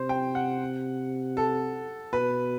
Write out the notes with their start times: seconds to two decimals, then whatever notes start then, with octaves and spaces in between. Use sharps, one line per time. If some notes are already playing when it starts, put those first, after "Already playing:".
Already playing: C3 C5
0.09 G5
0.35 F#5
1.37 A4
2.13 B2 B4